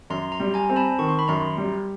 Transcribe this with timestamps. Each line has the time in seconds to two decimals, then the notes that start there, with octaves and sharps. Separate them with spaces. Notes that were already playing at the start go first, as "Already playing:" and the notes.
0.10 F#2 A#5 C6
0.32 A#5 C6
0.40 G3
0.54 G#5 A#5
0.69 C4
0.76 A5 B5
0.99 D#3 C#6
1.09 C6
1.19 B5
1.28 F#2 A#5 C6
1.57 G3